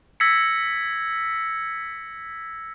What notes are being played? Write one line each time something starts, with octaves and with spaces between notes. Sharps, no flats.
E6 G#6 A#6 B6 C#7